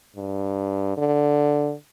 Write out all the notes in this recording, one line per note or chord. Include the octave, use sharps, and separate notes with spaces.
G2
D3